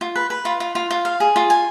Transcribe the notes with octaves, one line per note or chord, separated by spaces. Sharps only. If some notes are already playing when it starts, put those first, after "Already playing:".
F4
B4
B4
F4
F4
F4
F4
F5
G#4
F4
G#5